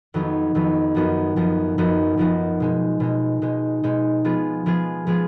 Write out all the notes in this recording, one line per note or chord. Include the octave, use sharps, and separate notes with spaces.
F2 D#3 F#3 B3 D#4
F2 D#3 F#3 B3 D#4
F#2 F3 B3 D#4 F#4
F#2 F3 B3 D#4 F#4
F#2 F3 B3 D#4 F#4
F#2 F3 B3 D#4 F#4
B2 G#3 D#4
B2 G#3 D#4
B2 G#3 D#4
B2 G#3 D#4
F3 G#3 B3 F4 G#4
F3 G#3 B3 F4 G#4
F3 G#3 B3 F4 G#4